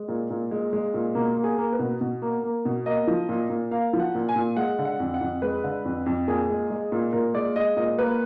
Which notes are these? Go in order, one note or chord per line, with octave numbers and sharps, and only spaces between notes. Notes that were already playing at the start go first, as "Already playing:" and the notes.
Already playing: G#3
A#2
A#2
G#3
G#3
A#2
B2 A#3
A#3
G#4
A#3
B4
B2
B2
A#3
A#3
B2
A#3 D#5
F3
A#2
A#2
A#3 F5
F3
F#5
A#2
G#5
A#2
G#3 F#5
D3
F#5
F2
F#5
F2
G#3 B4
D3
F2
F2
A#2 G#4
G#3
G#3
A#2
A#2 A#4
G#3 D5
G#3 D#5
A#2 D#5
A#3 B4